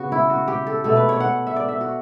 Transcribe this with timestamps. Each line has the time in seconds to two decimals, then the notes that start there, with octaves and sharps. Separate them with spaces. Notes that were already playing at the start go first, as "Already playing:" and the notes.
Already playing: C#3 B3 F#4
0.12 E4
0.30 F#4
0.48 G4
0.67 A4
0.84 B2 A3 A4
0.96 B4
1.09 C#5
1.20 F#5
1.47 E5
1.56 D5
1.69 E5
1.81 F#4